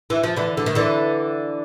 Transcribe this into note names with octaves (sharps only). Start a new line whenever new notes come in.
E3
F3
D3 E3
D3
D#3
D3 E3